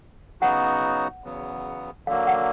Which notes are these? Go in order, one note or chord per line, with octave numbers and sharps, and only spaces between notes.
C#3 F#3 B3 D#4 F#4 F#5
E2 C#3 F#3 B3
D3 F#3 A#3 F5
F#5